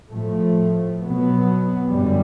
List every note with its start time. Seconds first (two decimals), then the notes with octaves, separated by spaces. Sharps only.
0.11 A2 F3 A3
1.01 B2 F#3 B3
1.91 F#2 D3 G3